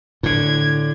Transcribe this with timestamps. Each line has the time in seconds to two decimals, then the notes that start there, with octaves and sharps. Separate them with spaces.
0.23 A2 D3 G#6